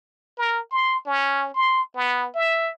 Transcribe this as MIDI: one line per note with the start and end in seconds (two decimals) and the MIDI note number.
0.38 0.60 70
0.71 0.99 84
1.06 1.51 61
1.54 1.82 84
1.95 2.27 59
2.34 2.70 76